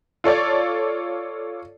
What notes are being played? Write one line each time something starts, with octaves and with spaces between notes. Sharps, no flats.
F4 A4 C#5 D5